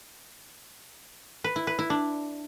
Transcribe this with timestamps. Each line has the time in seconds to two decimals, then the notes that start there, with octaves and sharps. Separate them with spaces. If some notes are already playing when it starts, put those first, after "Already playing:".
1.44 B4
1.56 E4
1.67 B4
1.79 E4
1.90 D4